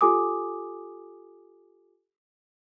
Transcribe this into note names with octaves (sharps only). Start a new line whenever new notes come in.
F4 G4 A4 G#5 D6 D#6